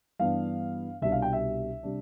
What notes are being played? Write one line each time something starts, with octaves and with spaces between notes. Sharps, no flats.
G2 E3 B3 D4 F5
C2 B2 G3 D4 E5
F5
G5
E5
C3 G3 D4